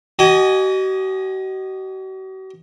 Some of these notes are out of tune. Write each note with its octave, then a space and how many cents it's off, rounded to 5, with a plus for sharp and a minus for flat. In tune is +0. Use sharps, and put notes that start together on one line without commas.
F#4 +45 D#5 -15 G#5 +0